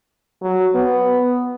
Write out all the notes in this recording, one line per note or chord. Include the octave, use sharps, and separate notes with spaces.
F#3
B3